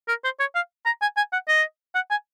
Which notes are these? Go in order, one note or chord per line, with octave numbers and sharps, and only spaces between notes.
A#4
C5
C#5
F5
A#5
G#5
G#5
F#5
D#5
F#5
G#5